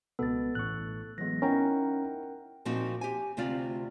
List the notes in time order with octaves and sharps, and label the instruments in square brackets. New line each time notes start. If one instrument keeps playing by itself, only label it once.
[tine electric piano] C#2 B2 [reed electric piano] B3 [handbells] A4 A6
[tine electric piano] A1 A2 C#6 [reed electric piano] F#6
[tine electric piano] E3 F#3 G#3 [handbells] B3 A#6
[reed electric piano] C#4 A#5 [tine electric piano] D#4 E4 [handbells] A#4 F#5 G5
[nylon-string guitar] A#2 F3 C4 D#4 F#4
G4 G#5
D2 C3 C4 F4 D5